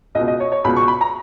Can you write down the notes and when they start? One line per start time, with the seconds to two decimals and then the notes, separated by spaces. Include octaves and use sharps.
0.15 C#2 D#5
0.20 B2
0.28 D#5
0.40 C#5
0.52 C#5
0.64 C#2 B2 B5
0.76 C#6
0.88 B5
1.01 A#5